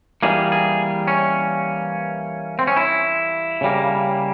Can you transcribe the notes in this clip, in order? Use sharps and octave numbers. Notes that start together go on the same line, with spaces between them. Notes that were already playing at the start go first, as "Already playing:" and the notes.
E3 G3 A#3 G#4
G#4
C#4
C4
C#4
E4
C#3 G3 A#3